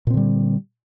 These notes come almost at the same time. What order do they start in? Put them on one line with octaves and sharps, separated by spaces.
A#2 C4 D3 G3